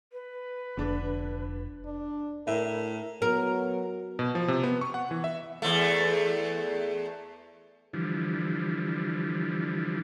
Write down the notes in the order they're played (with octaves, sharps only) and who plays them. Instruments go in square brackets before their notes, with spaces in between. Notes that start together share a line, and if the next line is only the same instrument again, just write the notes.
[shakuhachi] B4
[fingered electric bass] F1 [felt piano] D3 D4
[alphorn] D4
[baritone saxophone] A2 [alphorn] A#4 [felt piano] E5
[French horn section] F#3 B3 [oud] A#4
[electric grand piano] B2
F3
C3
B3
C#6
F#5
E3
E5
[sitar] E2 A3
[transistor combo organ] D3 E3 F3 G3